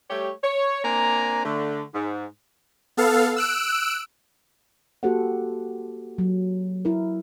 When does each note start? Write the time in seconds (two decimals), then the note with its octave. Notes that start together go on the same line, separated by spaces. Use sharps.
0.10 G3 A3 G4 C#5
0.44 C#5
0.84 A#3 C4 D4 G#5 A#5
1.45 D3 A3
1.94 G#2
2.97 B3 A4 F5
3.36 E6 F#6 D7
5.03 A#3 F#4 G4 A4 C5 F#5
6.18 F#3
6.85 E4 A#4